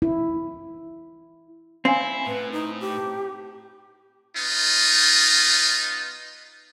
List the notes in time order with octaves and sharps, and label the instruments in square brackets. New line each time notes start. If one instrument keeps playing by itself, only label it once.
[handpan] E4
[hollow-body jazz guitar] C4 [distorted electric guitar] E4 [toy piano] F5 G#5
[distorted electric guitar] A2 [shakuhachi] B4
[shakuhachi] D#4
G4
[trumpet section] B3 D#4 F4